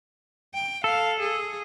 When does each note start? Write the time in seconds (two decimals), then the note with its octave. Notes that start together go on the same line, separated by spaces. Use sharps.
0.54 G5
0.84 A4 F5
1.20 G#4